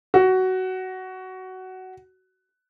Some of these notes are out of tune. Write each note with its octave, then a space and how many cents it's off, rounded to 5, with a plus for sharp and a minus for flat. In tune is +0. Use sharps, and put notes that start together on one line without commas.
F#4 +15